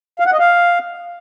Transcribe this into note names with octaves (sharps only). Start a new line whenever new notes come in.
F5
F#5
D#5
F5